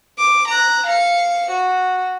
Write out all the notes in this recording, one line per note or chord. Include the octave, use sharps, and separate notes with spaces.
D6
A#5 F#6
F5 C#7
F#4